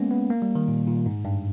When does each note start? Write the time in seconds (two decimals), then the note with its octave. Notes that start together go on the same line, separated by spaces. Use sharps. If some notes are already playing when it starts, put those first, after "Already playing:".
Already playing: G#3 A#3 B3 C#4
0.11 B3
0.30 A#3
0.42 G3
0.55 D#3
0.68 A#2
0.87 A#2
1.06 G#2
1.25 G2